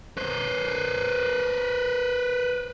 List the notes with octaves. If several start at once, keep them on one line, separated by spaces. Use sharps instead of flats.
B4 C5